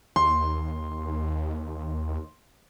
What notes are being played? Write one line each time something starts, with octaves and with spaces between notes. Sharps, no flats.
D#2 C6